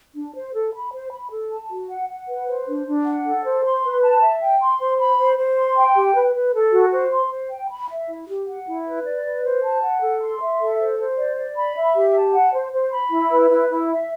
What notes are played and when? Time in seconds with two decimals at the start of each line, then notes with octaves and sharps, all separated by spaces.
0.15 D4
0.35 C5
0.54 A4
0.74 B5
0.93 C5
1.12 B5
1.31 A4
1.51 A5
1.71 F#4
1.90 F#5
2.09 F#5
2.28 B4
2.47 C5
2.67 D4
2.87 D4
3.06 F#5
3.26 A4
3.44 C5
3.64 C6
3.84 B4
4.03 A5
4.22 E5
4.41 G5
4.61 C6
4.80 C5
5.00 B5
5.19 C5
5.38 C5
5.57 C6
5.77 G5
5.95 G4
6.16 B4
6.35 B4
6.54 A4
6.73 F#4
6.92 C5
7.12 C6
7.31 C5
7.50 G5
7.70 B5
7.90 E5
8.09 E4
8.28 G4
8.47 F#5
8.67 E4
8.86 B4
9.05 D5
9.25 B4
9.43 C5
9.64 A5
9.82 F#5
10.02 A4
10.21 C6
10.41 E5
10.60 A4
10.79 C5
10.99 C5
11.19 D5
11.37 D5
11.56 B5
11.76 E5
11.96 G4
12.14 A5
12.33 F#5
12.53 C5
12.73 C5
12.92 B5
13.11 E4
13.31 B4
13.51 E4
13.69 E4
13.89 E5